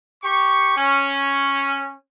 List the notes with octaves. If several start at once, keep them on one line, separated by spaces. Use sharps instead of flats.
G4 C#6
C#4